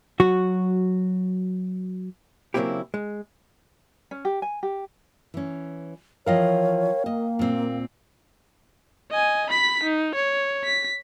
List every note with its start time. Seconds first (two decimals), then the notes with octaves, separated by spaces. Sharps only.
0.20 F#3 F#4
2.54 C#3 F#3 A#3 C4 E4 G4
2.94 G#3
4.11 C#4
4.25 G4
4.42 G#5
4.63 G4
5.34 E3 C#4
6.26 E3 F3 A#4 C#5 D#5 F5 G5
7.06 A#3 D#5
7.39 A#2 C4
9.11 D#5 G#5
9.50 B5 B6
9.84 D#4
10.15 C#5
10.64 B6